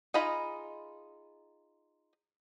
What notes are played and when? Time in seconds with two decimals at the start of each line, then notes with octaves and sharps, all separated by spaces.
0.14 D#4 F4 G#4 D#5 B5